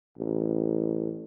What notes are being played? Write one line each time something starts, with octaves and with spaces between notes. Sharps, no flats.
A1